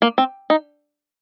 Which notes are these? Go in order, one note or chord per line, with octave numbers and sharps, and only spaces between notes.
A#3
C4
D#4